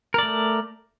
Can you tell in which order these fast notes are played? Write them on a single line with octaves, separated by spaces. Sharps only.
A#4 D5 A3